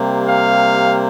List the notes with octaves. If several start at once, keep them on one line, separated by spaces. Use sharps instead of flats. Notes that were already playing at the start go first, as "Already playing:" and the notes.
Already playing: C3 G3 A#3
F5